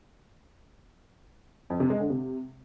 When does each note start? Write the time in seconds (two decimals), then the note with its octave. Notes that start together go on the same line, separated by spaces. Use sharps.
1.70 F2
1.80 C3
1.90 G#3
2.00 D3
2.10 C3